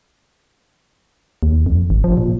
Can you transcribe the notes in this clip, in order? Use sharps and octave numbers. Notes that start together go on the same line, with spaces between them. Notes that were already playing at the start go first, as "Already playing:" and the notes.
D#2
F2
G#1
F3
A#2